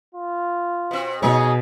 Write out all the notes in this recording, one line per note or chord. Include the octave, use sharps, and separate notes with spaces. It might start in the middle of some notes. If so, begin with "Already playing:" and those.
F4
B2 C4
B2 B3 D#4 G#4 C#5